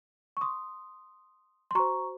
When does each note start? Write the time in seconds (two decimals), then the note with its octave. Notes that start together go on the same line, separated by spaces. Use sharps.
0.37 C#6
0.41 C6 D#6
1.71 C6
1.75 F#4 C5 A#5 C#6